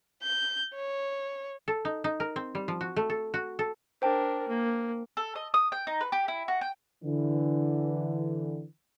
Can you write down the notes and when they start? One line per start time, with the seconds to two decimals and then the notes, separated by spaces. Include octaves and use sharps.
0.23 G6
0.75 C#5
1.68 A4
1.85 D#4
2.04 D#4
2.20 A#4
2.36 C4
2.55 G3
2.68 F3
2.81 F#4
2.96 A3
3.10 A4
3.34 F#4
3.59 A4
4.02 D4 A#4 C5 G5 A5
4.48 A#3
5.17 A4
5.35 D#5
5.54 D#6
5.72 G5
5.87 D#4
6.01 B4
6.12 G4
6.28 E4
6.48 F#4
6.61 G5
7.03 D3 E3